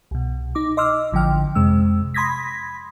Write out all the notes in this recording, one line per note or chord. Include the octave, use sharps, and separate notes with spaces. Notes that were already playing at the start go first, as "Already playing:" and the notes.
C2 B2
D#4 D6
D#5 C6 D6 E6 F6
A1 D3 F3 G5 F6
F2 C3 G#3 E6
B5 C6 D#6 G#6 A#6 B6